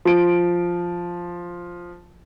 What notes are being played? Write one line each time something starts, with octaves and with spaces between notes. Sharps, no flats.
F3 D7